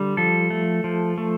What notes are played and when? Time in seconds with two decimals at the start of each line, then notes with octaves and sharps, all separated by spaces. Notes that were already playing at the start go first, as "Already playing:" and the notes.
Already playing: D3 G3
0.17 F3 A4
0.50 A3
0.84 F3
1.18 A3